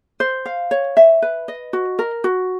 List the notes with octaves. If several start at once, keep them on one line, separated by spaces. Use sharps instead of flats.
C5
F5
C#5
E5
B4
D#5
F#4
A#4
F#4